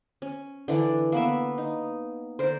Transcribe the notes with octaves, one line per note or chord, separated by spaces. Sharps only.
C#4
D3 E3 D4
A#3 B3 E5
D#4
D3 A#4 C5